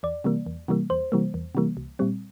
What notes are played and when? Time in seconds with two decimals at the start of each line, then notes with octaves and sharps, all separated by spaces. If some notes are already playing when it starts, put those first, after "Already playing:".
0.03 E2 D5
0.24 C3 E3 G3 A#3
0.46 E2
0.68 C3 E3 G3 A#3
0.90 E2 C5
1.12 C3 E3 G3 A#3
1.34 E2
1.55 C3 E3 G3 A#3
1.77 C2
1.99 A#2 G3 C4